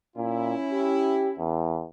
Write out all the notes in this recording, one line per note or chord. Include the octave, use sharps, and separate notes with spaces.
A#2 C#4 E4
G4
E2